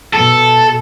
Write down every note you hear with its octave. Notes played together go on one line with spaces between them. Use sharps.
B2 A4